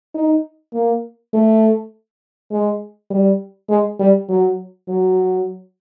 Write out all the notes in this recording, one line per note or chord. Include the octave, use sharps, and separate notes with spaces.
D#4
A#3
A3
G#3
G3
G#3
G3
F#3
F#3